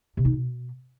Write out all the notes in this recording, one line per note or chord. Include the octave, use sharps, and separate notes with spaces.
C3
D#4
B2